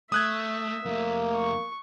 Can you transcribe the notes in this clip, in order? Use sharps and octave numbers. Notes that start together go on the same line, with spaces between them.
A3 E5 D#6 F#6 G#6
F2 A3 A#3
C#6